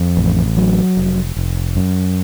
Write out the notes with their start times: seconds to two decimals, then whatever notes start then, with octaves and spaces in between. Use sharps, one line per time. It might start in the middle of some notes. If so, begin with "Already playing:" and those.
Already playing: F2
0.17 A1
0.57 F#3
0.97 F1
1.37 F1
1.76 F#2